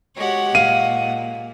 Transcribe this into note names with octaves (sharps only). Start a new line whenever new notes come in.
G#3 F#4 G4 C#5 F#5
A#2 F5 D#7